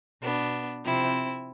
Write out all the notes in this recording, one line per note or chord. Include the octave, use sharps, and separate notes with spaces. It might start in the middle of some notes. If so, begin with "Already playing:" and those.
B2 B3 D4
C3 F3 C4 E4